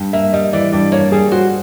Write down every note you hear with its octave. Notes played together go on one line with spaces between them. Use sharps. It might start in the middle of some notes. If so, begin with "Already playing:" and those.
Already playing: G2
A#3 E5
G3 D#5
E3 D5
G2 D5
A#3 C#5
G3 G#4
F#4 C5